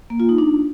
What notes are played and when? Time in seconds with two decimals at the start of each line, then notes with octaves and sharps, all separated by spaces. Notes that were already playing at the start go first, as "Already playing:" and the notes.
0.10 A#3
0.20 F4
0.29 D#4
0.38 D4